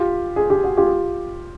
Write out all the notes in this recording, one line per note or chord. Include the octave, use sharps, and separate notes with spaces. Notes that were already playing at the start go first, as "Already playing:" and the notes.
Already playing: F4 G4
G#4
G4
F#4
F4 G4